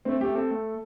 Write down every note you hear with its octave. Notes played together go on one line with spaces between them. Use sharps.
A3 C4
A3 G4
C4 A4
A3